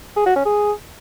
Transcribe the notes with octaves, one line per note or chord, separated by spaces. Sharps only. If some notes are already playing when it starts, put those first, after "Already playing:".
G#4
F#4
C#4
G#4